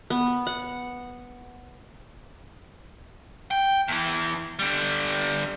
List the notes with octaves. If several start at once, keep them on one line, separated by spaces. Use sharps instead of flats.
B3
F#5
G5
E2 E3
D3 G3